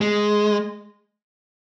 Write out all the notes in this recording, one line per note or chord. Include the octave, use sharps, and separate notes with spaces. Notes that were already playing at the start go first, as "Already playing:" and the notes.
G#3